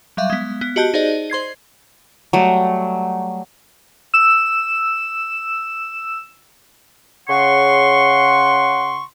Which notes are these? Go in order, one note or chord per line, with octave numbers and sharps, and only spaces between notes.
F#3 G3 E5 F5
G#3 B3
B3
F#4 G4 D#5 A5 F#6 G6
D#4 G#4 C5 D5 D#5
C5 C6 G#6 C7
F#3 G3 A3
E6 E7
C#3 F#5 C6 C#6